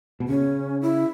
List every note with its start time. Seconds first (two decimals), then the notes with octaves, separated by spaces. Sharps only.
0.20 B2
0.28 C#3 C#4
0.81 E4